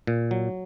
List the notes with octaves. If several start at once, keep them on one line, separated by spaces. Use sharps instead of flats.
A#2
F#3